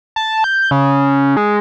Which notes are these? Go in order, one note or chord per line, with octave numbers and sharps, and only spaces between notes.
A5
G6
C#3
G#3